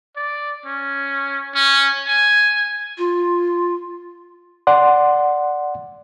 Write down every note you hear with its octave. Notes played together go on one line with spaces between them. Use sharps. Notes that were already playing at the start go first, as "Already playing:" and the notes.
D5
C#4
C#4
G#5
F4
D5 F#5 C6